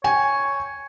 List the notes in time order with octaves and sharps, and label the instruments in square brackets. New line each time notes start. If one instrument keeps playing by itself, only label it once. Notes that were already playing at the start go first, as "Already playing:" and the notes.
[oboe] C#5 [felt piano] G5 G#5